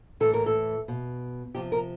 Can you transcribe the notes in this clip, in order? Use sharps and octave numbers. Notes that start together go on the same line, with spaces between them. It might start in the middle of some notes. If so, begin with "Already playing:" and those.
A2 E3 A4
A#4
A4
B2
C3 F3 G4
A#4